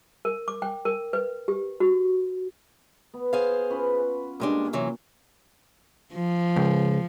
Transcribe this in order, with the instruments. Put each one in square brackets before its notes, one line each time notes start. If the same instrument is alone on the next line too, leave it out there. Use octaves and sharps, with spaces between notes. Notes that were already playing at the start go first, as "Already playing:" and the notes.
[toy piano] A#4
D6
G5
A#4
B4
G4
F#4
[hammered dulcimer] B3
[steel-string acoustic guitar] G#4 C5 F5
[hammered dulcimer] C#4 F4 B4
[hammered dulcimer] A#2 [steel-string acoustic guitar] G3 G#3 D4
[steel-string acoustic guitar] C3 E3 F#3
[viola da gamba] F3
[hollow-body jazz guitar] C#2